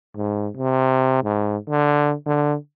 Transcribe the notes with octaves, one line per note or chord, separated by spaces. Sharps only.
G#2
C3
G#2
D3
D3